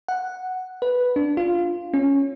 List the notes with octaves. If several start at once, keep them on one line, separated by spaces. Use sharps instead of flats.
F#5
B4
D4
F4
C#4